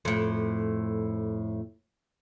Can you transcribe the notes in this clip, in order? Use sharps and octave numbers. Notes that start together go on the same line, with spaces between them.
F2 A2